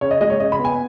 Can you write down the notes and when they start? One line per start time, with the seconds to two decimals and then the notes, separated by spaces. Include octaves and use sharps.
0.01 C#3 C#5
0.11 D#5
0.21 G#3 D#5
0.30 C#5
0.40 C#3 D#5
0.52 B5
0.59 B3
0.65 G#5